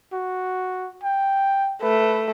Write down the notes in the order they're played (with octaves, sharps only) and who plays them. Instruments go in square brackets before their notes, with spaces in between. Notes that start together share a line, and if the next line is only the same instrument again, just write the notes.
[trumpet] F#4
G5
[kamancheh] A3 [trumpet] B4